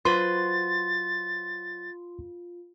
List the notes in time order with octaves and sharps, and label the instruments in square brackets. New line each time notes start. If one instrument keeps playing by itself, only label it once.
[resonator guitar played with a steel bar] F#3 B4 C5 [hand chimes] F4 [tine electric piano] C6 [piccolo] A6